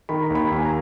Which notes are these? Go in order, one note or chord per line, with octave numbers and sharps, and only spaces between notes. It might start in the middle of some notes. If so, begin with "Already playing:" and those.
D#3 B5
A#5
D#2
B5
D#2
G#5
A#5